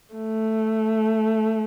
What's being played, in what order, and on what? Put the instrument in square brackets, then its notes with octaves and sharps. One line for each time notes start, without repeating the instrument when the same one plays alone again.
[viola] A3